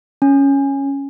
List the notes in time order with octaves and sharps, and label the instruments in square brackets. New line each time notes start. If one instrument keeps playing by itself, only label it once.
[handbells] C#4